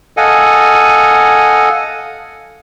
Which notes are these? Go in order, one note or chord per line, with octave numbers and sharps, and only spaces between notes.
A4 D#5 F5 F#5 G#5